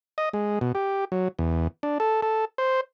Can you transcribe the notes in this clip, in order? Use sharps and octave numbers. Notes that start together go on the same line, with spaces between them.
D#5
G#3
B2
G4
F#3
E2
D4
A4
A4
C5